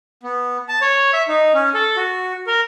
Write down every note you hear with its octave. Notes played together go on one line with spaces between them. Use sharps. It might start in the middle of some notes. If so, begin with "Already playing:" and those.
B3
A5
C#5
E5
D#4
C#4
A4
F#4
A#4